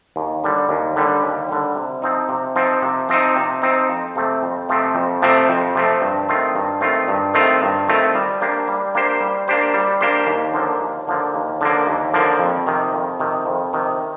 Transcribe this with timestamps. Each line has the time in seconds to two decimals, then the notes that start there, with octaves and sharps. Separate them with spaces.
0.16 D#2
0.44 D3 G3
0.69 D#2
0.96 D3 G3
1.23 D#2
1.49 D3 G3
1.76 C3
2.02 F3 C4 D#4
2.29 C3
2.55 F3 C4 D#4
2.82 C3
3.09 F3 C4 D#4
3.36 C3
3.62 F3 C4 D#4
3.89 F2
4.16 C3 F3 A3 C4
4.43 F2
4.69 C3 F3 A3 C4
4.95 F2
5.22 C3 F3 A3 C4
5.49 F2
5.75 C3 F3 A3 C4
6.01 G2
6.29 D#3 A3 C4 F4
6.55 G2
6.81 D#3 A3 C4 F4
7.08 G2
7.34 D#3 A3 C4 F4
7.62 G2
7.88 D#3 A3 C4 F4
8.15 G3
8.40 A#3 D4 G4 C5
8.68 G3
8.95 A#3 D4 G4 C5
9.20 G3
9.48 A#3 D4 G4 C5
9.74 G3
10.01 A#3 D4 G4 C5
10.27 D#2
10.54 D3 F3 A#3
10.81 D#2
11.07 D3 F3 A#3
11.34 D#2
11.61 D3 F3 A#3
11.87 D#2
12.14 D3 F3 A#3
12.39 F2
12.67 C3 D#3
12.94 F2
13.20 C3 D#3
13.46 F2
13.73 C3 D#3